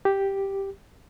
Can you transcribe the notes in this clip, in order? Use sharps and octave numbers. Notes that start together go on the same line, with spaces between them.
G4